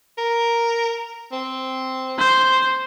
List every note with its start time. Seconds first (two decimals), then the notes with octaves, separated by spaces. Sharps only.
0.18 A#4
1.32 C4
2.18 C5